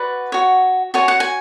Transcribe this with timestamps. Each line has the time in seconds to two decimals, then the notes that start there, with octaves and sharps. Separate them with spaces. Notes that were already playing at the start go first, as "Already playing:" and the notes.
Already playing: F#4 B4 D5 F#5
0.32 F#4 C#5
0.94 F#4 C#5 G#5
1.08 F#5
1.20 G#5